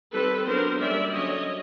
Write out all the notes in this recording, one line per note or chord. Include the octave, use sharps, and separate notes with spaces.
D#3 G3 C4 A4 B4
F#3 B3 D4 A#4 C5
G3 A#3 C#4 D5 E5
D3 F#3 A#3 C#4 C#5 D#5